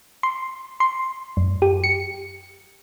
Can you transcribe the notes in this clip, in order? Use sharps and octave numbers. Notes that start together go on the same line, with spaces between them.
C6
C6
F#2
G4
C#7